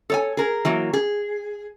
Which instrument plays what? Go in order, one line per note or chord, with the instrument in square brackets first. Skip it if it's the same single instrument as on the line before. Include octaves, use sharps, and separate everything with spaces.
[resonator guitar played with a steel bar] A4 C#5 G#5
G#4 A#4
E3 F#3 A#3
G#4